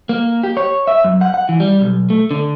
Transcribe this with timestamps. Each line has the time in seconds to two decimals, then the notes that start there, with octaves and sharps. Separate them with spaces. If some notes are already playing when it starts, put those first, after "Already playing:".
0.09 A#3
0.43 G4
0.57 C#5
0.87 E5
1.04 F#2
1.21 F#5
1.34 F#5
1.49 E3
1.60 G3
1.81 B1
2.10 A3
2.31 D3